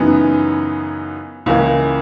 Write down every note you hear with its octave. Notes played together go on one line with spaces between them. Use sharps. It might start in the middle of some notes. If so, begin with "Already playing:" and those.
Already playing: F#2 C#3 E3 B3 D#4
C#2 C#3 E3 A#3